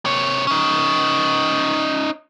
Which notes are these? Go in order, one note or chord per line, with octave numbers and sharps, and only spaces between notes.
C3 C#5
C#4 D#4